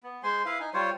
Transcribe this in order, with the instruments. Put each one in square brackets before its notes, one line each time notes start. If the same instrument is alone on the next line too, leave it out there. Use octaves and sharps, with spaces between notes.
[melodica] B3
G#3 C5 G#5 C6
E4 B4 F5
D#4 G#5
G3 F4 C5 C#5